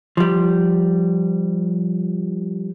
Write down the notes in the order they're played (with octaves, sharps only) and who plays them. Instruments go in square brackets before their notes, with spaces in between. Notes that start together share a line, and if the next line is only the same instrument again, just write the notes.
[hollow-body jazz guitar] F3 G3